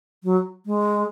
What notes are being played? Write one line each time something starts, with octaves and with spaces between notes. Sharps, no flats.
F#3
G#3